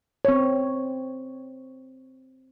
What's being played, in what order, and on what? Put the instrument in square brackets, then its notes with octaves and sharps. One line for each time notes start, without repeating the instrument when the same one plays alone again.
[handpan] C4 C#5